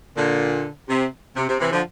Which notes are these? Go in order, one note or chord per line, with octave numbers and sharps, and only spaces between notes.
A#2 D3
C3
C3
C3
C3 E3
D3 F3